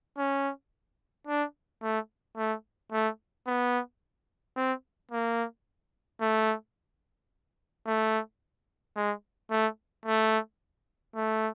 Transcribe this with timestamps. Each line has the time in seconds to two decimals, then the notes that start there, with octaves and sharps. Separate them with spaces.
0.18 C#4
1.27 D4
1.82 A3
2.37 A3
2.92 A3
3.47 B3
4.56 C4
5.12 A#3
6.21 A3
7.86 A3
8.96 G#3
9.51 A3
10.06 A3
11.15 A3